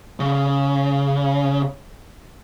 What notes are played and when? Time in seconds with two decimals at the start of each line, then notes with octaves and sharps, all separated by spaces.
0.20 C#3